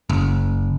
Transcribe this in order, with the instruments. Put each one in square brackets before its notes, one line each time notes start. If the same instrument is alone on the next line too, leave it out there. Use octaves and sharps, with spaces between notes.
[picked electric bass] F#1